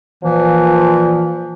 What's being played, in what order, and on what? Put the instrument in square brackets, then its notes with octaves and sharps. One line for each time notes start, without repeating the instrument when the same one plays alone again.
[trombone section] A#2 F3 [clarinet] E3